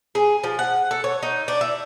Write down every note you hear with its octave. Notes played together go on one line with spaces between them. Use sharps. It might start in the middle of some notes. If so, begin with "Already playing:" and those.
G#4
F3
F#5
A4
C#5
D#4
D4
E4